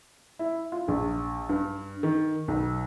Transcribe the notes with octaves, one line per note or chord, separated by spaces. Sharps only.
E4
F4
A#1
G2
D#3
B1